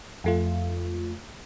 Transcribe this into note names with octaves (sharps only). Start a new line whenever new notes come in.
F2 A3 F4